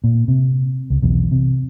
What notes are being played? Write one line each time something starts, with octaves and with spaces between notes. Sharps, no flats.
A#2
C3
C#2
B1 E2
C3